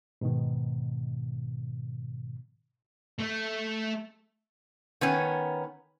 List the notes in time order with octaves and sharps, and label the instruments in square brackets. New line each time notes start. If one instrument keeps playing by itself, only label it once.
[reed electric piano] G#2 B2 D#3
[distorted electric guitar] A3
[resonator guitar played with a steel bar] D#3 B3 C#4